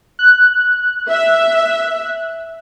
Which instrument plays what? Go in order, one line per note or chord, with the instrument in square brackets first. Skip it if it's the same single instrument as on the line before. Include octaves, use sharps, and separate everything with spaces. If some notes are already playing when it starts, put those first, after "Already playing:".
[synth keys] F#6
[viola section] E5